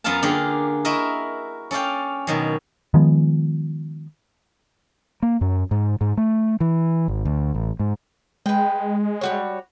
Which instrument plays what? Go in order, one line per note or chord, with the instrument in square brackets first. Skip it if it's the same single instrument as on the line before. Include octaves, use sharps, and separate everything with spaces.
[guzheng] F#2 B3 F4 A#4 F5 A5
D3 A#3 F4 G4 G#4
E4 F#4 A#4 D#5 E5
C#4 A4 D5 F5 G5
B2 D#3 F#3
[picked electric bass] D#3 F3 G#3 B3
[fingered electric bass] A#3
F#2
G#2
G#2
A3
E3
G#1
D2
A1
G#2
[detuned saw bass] G#3 [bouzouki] B4 G5
[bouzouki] G3 F#4 C#5